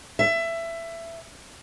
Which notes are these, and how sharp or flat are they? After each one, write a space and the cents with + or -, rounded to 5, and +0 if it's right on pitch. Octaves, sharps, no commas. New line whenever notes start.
E5 +20